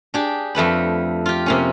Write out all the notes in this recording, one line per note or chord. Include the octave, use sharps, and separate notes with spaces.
D4 G4 G#4
F2 A3 B4 B5
F4 G4
C3 A#3 C#4